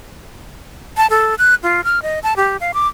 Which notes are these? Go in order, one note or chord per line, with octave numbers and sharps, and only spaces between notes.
A5
A4
F#6
F4
F6
D#5
A5
G4
F5
D6